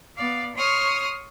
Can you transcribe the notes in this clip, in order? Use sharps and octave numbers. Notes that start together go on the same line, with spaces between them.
B3 D5 F5
C#5 C6 C#6 D#6 F6